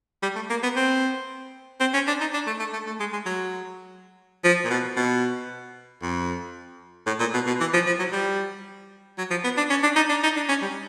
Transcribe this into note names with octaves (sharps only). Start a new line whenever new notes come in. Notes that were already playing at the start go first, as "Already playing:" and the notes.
G3
A3
A#3
B3
C4
C4
C#4
D4
D#4
D4
A3
A3
A3
A3
G#3
G#3
F#3
F3
A#2
B2
B2
F2
A2
A#2
B2
B2
E3
F3
F3
F#3
G3
F#3
F3
B3
D4
C#4
D4
D#4
D4
D#4
D4
C#4
G3